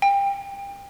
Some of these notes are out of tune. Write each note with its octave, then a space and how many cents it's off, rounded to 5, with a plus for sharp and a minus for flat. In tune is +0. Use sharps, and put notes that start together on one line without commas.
G5 +25